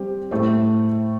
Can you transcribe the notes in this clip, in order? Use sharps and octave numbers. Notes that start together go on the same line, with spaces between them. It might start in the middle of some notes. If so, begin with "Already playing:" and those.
Already playing: G3 C4 G4
A2 A3 E4 C5